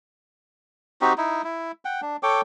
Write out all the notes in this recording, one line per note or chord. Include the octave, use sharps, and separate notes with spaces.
C4 D#4 F#4 G4
D#4 E4
E4
F#5 G5
D4
A4 C#5 G5 D6